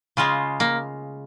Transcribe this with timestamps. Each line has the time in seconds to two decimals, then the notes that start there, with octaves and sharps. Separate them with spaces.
0.17 C#3 G#3 F4
0.60 A#3